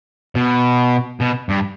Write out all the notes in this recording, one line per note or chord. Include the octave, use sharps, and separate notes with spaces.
B2
B2
G2